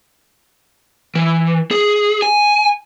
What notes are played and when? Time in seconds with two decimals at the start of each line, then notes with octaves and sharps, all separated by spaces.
1.15 E3
1.71 G#4
2.22 G#5